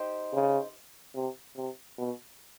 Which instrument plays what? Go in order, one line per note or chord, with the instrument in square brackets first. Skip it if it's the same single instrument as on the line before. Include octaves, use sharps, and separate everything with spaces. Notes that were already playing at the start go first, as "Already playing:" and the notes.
Already playing: [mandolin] D#4 G4 C5
[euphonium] C#3
C3
C3
B2